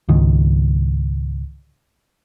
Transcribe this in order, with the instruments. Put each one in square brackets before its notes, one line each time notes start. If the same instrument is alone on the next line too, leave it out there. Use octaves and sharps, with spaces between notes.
[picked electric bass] C#2 G#2 D#3